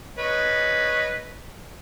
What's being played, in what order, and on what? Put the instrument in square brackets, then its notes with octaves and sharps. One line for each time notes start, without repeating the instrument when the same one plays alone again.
[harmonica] B4 C#5 D#5